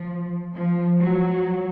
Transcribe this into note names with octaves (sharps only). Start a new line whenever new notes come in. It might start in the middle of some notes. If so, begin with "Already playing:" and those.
Already playing: F3
F3
F#3